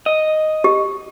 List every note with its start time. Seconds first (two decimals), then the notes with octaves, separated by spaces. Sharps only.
0.06 D#5
0.64 G4